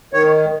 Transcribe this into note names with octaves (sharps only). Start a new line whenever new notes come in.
D#3 C#5